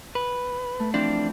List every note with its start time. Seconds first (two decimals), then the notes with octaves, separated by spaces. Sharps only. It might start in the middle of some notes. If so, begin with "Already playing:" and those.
0.15 B4
0.80 A3
0.94 E3 F3 C4 D4